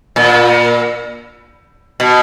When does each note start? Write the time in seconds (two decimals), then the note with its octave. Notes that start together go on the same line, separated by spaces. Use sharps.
0.16 A#2
2.00 B2